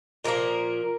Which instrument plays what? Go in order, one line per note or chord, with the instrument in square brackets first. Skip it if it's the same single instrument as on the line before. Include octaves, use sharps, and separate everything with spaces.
[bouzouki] A#2 F3 A#3 A#4